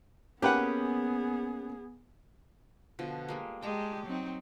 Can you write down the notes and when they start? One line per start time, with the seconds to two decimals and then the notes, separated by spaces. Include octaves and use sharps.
0.42 A#3 B3 C#4 G4 G#4 B4 F#5
2.99 B2 D3 F3
3.29 G3 G#3 A#3
3.62 G#3 G4 G5 A5 A#5
4.07 F#3 C4 D#4